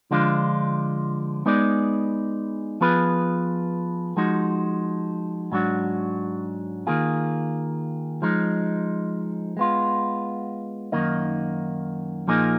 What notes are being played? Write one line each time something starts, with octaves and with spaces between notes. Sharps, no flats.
D3 F3 G#3 D4 F4
G#3 B3 D#4 G#4 D5
F3 B3 F4 G#4 B4
F3 G#3 D#4 F#4
G#2 F#3 D4 F#4
D#3 A#3 F4 G#4
F3 G#3 D#4
G#3 B3 F4
F#2 D#3 A#3 D#4
A#2 F3 A#3 D#4 G#4